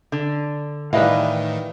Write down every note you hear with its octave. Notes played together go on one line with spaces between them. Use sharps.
D3
A2 D#3 E3 G3 B4 D#5 F5